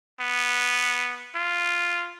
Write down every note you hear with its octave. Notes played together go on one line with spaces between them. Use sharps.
B3
F4